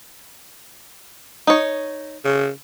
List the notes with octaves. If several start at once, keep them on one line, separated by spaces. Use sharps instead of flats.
D#4 C#5
C#3